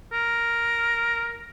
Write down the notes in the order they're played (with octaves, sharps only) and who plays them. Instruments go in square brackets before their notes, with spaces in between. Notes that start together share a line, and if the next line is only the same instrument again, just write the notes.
[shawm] A#4